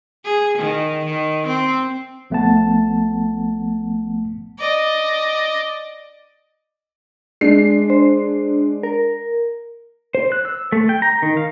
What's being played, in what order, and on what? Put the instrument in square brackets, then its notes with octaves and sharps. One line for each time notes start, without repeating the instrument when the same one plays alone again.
[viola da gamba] G#4
D#3
D#3
C4
[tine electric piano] A#1 F3 A3 B3 F#5 A5
[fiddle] D5 D#5
[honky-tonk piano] G#3 D4 C7
[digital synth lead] C5
A#4
[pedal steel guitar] C5
F#6
E6
A3
G5
A#5
D#3
F5